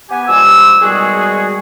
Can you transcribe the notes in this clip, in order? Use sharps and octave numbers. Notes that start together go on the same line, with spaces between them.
B3 G4 G#5
G2 F3 G#3 G4 E6
B2 D#3 G3 G#3 F#4 G#4